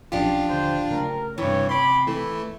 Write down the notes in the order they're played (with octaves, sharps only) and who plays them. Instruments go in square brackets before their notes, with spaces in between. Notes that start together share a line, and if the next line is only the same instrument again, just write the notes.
[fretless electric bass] B1 C#4 [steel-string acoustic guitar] F3 G4 [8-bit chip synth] D4 F4
[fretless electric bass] D#1 D3 [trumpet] C5
[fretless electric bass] C#3 A3 [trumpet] A#4
[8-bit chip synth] G2 E3 [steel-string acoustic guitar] C3 [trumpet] C#5
[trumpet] B5 [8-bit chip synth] C6 D6
[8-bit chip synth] E3 A3 [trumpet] E4